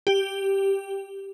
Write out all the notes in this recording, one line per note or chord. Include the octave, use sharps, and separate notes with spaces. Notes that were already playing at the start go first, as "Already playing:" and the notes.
G4